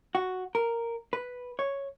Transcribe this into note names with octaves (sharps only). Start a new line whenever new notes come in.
F#4
A#4
B4
C#5